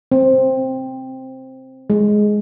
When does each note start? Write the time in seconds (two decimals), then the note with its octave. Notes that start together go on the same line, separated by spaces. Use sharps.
0.12 C4
1.90 G#3